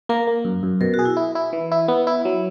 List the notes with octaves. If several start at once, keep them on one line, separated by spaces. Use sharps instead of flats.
A#3 A#4
A#3
F#2
F#2
B2 A#4
F#4
G#4
E4
E4
E4
E3
E4
B3
E4
F#3